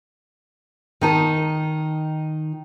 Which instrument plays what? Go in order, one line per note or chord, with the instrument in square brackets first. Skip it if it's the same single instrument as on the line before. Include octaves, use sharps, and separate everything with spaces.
[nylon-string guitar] D#3 D#4 A5